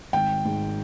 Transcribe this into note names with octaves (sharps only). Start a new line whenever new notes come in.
G#1 G5
G#2